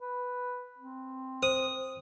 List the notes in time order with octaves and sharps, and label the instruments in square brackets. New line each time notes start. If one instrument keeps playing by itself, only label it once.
[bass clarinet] B4
C4
[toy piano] C5 [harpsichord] D#6